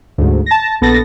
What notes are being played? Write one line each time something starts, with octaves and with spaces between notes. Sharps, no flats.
D2 G#2
A5 A#6
A#1 B3 A4 A6 A#6